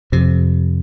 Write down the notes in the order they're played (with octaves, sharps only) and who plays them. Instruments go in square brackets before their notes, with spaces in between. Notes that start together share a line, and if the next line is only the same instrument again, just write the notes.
[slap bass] F2 C3